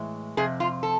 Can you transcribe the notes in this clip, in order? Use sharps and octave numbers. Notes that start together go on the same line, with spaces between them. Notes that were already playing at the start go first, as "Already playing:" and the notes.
Already playing: A2 E3 G#3
F2 C3 G#4
F4
A4